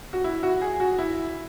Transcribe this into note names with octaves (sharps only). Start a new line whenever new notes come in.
F#4
E4
F#4
G#4
F#4
E4